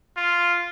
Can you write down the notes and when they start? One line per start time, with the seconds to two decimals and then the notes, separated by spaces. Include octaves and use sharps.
0.17 F4